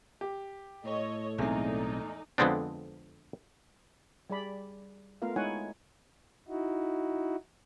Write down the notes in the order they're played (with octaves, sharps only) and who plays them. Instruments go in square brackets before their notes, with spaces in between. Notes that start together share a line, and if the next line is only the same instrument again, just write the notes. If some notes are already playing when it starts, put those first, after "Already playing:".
[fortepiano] G4
[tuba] A2 [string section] A4 C#5 D#5
[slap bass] B1 C4 [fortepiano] E2 G#3 [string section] D#4 A4 D5
[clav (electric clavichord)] F2 D3 G#3 B3 C4 D4
[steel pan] G3 G#4 D5 B5
A3 B3 F4 A#4 F5
G#3 D#4 E4 C#5 F#5 G#5
[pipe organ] D#4 E4 F#4